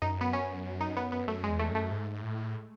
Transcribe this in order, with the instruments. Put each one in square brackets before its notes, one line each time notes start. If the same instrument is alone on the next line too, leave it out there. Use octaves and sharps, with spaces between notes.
[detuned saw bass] F#2 [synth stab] D#4
[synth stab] B3
C#4
D#4
B3
B3
[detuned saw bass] F#2 [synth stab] A3
[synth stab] G#3
[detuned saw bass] E2
[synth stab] A3
[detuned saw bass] F#2
[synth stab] A3
[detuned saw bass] G#2
A2